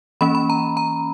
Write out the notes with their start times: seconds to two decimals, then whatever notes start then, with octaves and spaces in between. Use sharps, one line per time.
0.21 E3 A#3 C#4 B5
0.35 B5
0.50 A#5
0.77 A#5